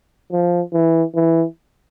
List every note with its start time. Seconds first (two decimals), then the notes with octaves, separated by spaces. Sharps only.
0.32 F3
0.73 E3
1.15 E3